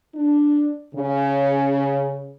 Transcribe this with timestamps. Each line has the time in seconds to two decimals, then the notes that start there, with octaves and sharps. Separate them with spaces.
0.15 D4
0.95 C#3